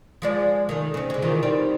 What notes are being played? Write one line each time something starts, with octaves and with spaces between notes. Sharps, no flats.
F3 G#3 D5
D#3 A3
C#3 C4
D3 G#3
D#3 E3 F4
D#3 G3 C4